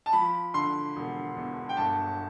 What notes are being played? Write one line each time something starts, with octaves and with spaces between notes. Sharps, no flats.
A5
F3 B5
D3 C6
E1
E2
G5
G1 A5